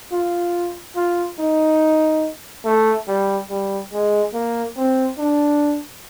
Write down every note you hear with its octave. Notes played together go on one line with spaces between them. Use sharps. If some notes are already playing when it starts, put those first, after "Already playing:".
F4
F4
D#4
A3
G3
G3
G#3
A#3
C4
D4